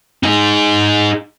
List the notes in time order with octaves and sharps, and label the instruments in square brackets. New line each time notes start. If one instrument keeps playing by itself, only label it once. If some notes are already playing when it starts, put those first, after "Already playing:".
[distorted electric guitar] D#4 G#4